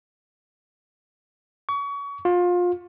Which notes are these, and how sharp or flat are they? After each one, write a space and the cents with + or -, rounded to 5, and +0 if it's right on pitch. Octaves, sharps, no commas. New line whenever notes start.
C#6 +30
F4 +25